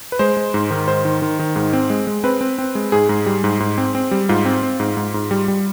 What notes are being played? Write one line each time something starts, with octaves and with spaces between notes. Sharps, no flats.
B4
G#3 C5
G#3
G#2
D#3
G#2 C5
D#3
D#3
D#3
G#2
C4
G#3
G#3
C4 B4
C4
C4
G#3
G#2 G#4
G#2
G3
G#2
G#2
C4
C4
G3
G#2 F4
C4
C4
G#2
G#2
G#2
G3
G3